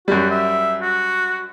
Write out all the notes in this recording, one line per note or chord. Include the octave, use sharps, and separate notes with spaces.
F#2 G3 F#4
E5
F#4